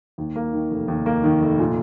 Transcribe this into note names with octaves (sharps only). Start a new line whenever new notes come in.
D#2
A#3
D#3
F1
D#2
A#3
D#3
F1
A#2